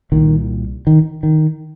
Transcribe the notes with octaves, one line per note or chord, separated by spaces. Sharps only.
C2 A#2 D#3
D#3
D#3